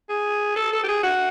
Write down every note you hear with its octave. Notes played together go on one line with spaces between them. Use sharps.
G#4
A4
A4
G4
G#4
F#4